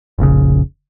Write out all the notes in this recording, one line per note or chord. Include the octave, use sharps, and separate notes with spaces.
F1 A#1 A2 C#3